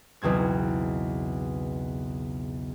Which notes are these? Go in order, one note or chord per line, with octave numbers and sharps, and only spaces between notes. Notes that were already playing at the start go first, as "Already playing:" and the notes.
B1 E2 C#3 C4 G#6